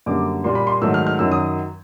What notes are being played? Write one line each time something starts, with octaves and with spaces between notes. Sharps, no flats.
F#2 D3 G3 A#3 D6
A#2 G3 A#3 C6
B5
C6
G#2 D#3 F#3 A3 E6
F6
F6
F#2 D#3 F#3 E6
D#6